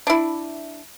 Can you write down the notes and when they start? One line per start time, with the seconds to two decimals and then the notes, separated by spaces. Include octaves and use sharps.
0.07 D4 E4